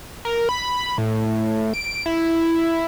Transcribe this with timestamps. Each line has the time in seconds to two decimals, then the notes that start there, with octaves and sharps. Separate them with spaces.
0.25 A#4
0.49 B5
0.98 A2
1.74 D7
2.06 E4